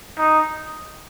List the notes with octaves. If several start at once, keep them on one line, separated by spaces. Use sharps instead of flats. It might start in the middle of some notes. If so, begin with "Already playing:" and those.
D#4